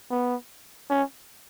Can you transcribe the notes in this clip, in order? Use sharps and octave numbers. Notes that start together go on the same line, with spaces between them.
B3
C#4